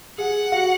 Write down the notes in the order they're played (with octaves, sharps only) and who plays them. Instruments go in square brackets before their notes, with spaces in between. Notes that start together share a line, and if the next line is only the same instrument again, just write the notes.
[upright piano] G#4 [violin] F#5
[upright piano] F#4